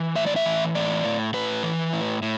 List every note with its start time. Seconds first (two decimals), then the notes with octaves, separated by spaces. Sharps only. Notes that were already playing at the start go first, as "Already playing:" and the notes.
Already playing: E3
0.15 A2 E5
0.27 D5
0.36 E5
0.45 E3
0.75 A2 D5
1.04 A2
1.34 A2 B4
1.63 E3
1.93 A2
2.22 A2